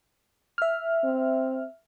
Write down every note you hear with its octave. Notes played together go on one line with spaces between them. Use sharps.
E5 F6
C4